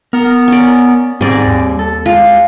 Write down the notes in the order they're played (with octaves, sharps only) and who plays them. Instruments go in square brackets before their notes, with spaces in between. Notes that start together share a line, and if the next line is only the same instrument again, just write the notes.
[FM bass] B3 [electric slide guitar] A#4
[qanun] C#4 D5
[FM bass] G#2 [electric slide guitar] G3 C4 [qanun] G#4 D5
[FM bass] D#2
[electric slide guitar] A4
[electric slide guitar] G#3 [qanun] F4